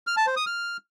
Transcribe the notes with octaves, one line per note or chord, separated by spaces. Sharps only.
F6
A5
C5
D#6
F6